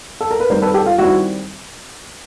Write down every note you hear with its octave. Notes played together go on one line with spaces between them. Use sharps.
A4
A#4
B4
D#3 G3 C4 A#4 C5
A4 B4
G4 A4
F4
D#3 G3 C4 E4 F#4